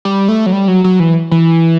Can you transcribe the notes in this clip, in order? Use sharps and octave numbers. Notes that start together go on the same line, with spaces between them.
G3
A3
F#3
G3
F#3
F#3
E3
E3